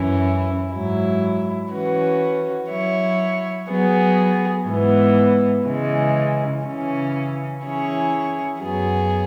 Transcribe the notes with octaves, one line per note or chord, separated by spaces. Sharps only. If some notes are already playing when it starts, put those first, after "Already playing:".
Already playing: F#2 E3 C#4 E4
G#2 F#3 E4
E3 C#4 F#4 B4
F#3 E4 C#5
F#3 B3 G#4
G#2 E3 B3
C#3 E3 G#3
C#3 E3 C#4
E3 C#4 E4 G#4 C#5
F#2 F#3 B3 G#4